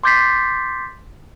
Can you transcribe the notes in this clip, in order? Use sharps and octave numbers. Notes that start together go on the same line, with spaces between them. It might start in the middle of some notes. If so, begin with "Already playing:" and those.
C6 D6 G6 A6 B6 C7